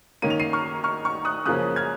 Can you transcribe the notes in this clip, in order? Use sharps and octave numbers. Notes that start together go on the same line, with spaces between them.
D#3 A#3 C#4 D#7
F7
C7 D#7
C#6 F6
C#6 F6
C#6 F6
D#6 F#6
F#2 C#3 F3 A#3 C#4 D#6 F#6
F6 G#6